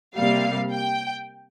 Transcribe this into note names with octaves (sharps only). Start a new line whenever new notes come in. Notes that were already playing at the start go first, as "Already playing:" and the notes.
C3 G3 A#3 F5
G5